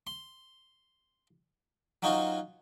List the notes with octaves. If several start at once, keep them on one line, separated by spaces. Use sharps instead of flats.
C6
F#3 C#4 D#4 F4 F#4 C5